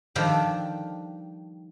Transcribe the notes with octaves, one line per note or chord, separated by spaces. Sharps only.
D#3 F3 G3 D4 G4 A4